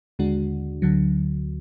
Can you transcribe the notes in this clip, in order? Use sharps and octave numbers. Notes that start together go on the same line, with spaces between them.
D#2 D3 G#3 D4 F#4
D2 D3 F#3